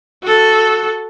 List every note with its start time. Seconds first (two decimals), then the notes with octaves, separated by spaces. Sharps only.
0.22 F#4 A4